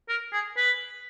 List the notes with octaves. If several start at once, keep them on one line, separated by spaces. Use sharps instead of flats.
A#4
G#4
B4